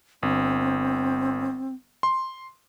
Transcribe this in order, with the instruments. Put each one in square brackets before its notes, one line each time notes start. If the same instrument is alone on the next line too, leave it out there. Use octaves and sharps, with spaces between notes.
[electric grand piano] G1 [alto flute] C4
[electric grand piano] C6